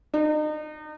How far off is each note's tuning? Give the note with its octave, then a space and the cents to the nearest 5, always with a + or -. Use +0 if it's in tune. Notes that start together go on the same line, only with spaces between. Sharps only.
D#4 -35